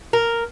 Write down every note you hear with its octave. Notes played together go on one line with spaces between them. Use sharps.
A#4